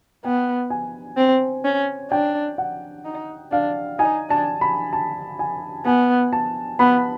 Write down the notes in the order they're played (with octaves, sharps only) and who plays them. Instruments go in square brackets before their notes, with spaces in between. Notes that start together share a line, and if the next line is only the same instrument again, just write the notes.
[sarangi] B3 [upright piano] G5
[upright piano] G#5
[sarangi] C4
C#4
[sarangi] D4 [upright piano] G5
[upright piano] F#5
[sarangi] D#4
[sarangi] D4 [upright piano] F5
[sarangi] D#4 [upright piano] G#5
[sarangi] D4 [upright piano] A5
[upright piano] B5
A5
G#5
[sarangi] B3 [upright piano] G#5
[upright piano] A5
[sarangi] B3 [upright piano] B5